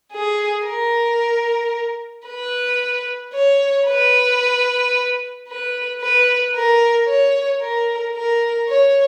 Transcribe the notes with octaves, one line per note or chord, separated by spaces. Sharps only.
G#4
A#4
B4
C#5
B4
B4
B4
A#4
C#5
A#4
A#4
C#5